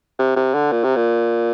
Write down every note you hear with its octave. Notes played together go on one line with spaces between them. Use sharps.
C3
C3
D3
A#2
C3
A#2